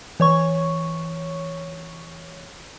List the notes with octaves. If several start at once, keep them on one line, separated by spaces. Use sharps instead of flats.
E3 C#5 C#6